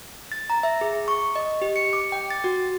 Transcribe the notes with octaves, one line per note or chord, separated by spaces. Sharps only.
A6
A#5
E5
G#4
C#6
D#5
G4
C#7
D6
G5
A6
F#4